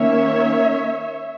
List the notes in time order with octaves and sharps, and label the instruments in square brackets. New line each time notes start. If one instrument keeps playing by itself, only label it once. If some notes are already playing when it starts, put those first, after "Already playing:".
Already playing: [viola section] D#3 A#3 C#4 C#5 E5